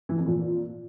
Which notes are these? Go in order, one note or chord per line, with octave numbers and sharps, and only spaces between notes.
E3
F2
A#2